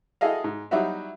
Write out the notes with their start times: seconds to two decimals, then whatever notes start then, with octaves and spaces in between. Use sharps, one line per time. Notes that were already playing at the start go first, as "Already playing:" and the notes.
0.21 E4 F#4 G#4 A4 D#5 F5
0.44 G#2
0.71 F#3 G3 D#4 E4 F#4 E5